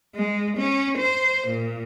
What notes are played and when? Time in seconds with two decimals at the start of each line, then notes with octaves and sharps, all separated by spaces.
0.15 G#3
0.57 C#4
0.98 C5
1.47 A#2